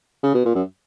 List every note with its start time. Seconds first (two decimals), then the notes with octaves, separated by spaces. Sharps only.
0.24 C#3
0.35 B2
0.45 A#2
0.55 F#2